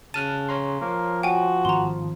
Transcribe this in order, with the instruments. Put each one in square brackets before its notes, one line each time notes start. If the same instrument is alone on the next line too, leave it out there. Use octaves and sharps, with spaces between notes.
[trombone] C#3 [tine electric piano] A5 F6 F#6 [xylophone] D#7
[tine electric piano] C#5 A#5 C6
[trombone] F3 [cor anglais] A#3
[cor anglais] F#4 [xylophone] G5 G#5
[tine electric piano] G#1 [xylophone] A#5 C6